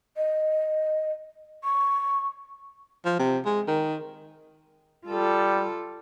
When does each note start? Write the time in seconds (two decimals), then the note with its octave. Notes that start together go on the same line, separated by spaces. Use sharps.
0.17 D#5
1.64 C#6
3.05 F3
3.19 C3
3.45 G#3
3.67 D#3
5.07 G3 F4 A4